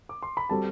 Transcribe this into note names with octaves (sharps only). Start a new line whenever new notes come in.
D6
C6
B5
G3 C4 F#4 A4 A5